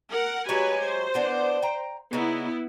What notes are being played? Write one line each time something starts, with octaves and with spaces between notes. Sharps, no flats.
A#4 F#5
F#3 G#3 G4 B4 C#5 G#5
C5
E3 B3 D4
G5 A#5
C#3 B3 D#4 E4